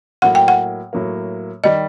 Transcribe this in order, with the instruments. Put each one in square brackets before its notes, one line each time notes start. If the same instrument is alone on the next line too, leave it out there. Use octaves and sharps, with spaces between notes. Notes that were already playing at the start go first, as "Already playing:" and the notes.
[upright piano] A2 F#3 A#3 [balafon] F#5
[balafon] G5
F#5
[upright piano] A2 F#3 A#3
[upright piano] D#3 G3 [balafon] D#5